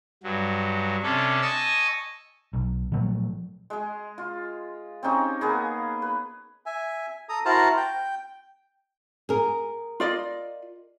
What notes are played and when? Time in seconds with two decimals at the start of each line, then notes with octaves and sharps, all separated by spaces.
0.23 G2 F#3
1.03 C3 C#4 D4 A4
1.42 D#5 G#5 A5 C#6 D#6 E6
2.53 B1
2.92 A#2 F3 F#3 A3
3.70 G#3 G#4
4.18 F4
5.03 C4 C#4 D#4 G4
5.41 A#3 B3 G#4
6.02 B4
6.66 E5 G#5
7.29 A4 A#5 D#6
7.45 E4 F#4 A#4 C5 A5 A#5
7.77 G5
9.29 G#4 A#4
10.00 F4 D5 D#5